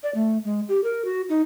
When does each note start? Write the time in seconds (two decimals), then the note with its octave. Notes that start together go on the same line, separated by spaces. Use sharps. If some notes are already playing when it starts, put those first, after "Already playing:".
0.03 D5
0.15 A3
0.45 G#3
0.69 G4
0.84 A#4
1.05 F#4
1.29 D#4